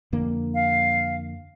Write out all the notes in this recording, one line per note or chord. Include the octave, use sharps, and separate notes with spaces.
F2 D3 A#3
F5